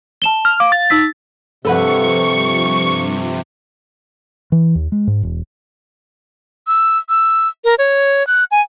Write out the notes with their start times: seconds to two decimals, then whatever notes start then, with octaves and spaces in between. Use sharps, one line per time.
0.22 A5 E7 G7
0.45 F6
0.60 F5 D6
0.72 A6
0.90 D#4 E6 B6
1.65 G2 C3 F3 A4 B4 F#5 C#6
4.52 E3
4.75 D#2
4.92 G#3
5.07 G#2
5.23 E1
6.67 E6
7.09 E6
7.65 A#4
7.78 C#5
8.27 F#6
8.51 G#5